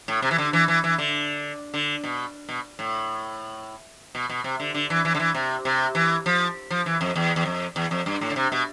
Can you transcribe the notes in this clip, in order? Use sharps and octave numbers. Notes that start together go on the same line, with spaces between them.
A2
C3
E3
D3
E3
E3
E3
D3
D3
B2
B2
A2
B2
B2
C3
D3
D3
E3
E3
D3
E3
C3
C3
E3
F3
F3
E3
F2
E2
E2
F2
E2
F2
G2
A2
D3
C3
B2